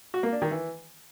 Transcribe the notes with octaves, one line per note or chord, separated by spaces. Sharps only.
F#4
A#3
D4
D#3
E3